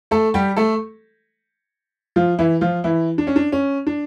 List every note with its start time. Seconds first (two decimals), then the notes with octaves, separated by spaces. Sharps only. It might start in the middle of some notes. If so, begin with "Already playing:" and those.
0.11 A3 A4
0.34 G3 G4
0.57 A3 A4
2.16 F3 F4
2.39 E3 E4
2.61 F3 F4
2.84 E3 E4
3.18 D4
3.27 C#4
3.36 D4
3.52 C#4
3.87 D4